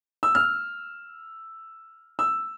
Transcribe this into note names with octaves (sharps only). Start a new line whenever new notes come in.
E6
F6
E6